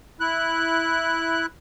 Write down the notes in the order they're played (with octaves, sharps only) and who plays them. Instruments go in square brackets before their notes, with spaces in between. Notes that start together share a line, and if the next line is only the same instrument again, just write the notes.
[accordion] E4 F#6